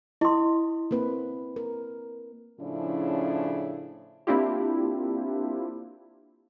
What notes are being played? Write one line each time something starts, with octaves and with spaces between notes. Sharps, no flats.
E4 D#5 C6
A#3 C4 B4
A#4
A2 C#3 F3 C#4 D4 E4
A#3 C4 D4 E4 F4 G4